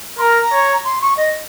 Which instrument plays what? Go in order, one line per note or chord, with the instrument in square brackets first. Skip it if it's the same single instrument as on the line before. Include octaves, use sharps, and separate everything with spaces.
[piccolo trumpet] A#4 [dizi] A#5 C6
[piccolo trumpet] C#5
[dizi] C6
C#6
D#5